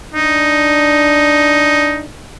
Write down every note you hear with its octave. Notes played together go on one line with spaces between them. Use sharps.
D4 D#4